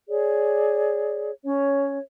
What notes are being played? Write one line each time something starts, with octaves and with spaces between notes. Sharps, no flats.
G#4 C#5 D5
C#4 C#5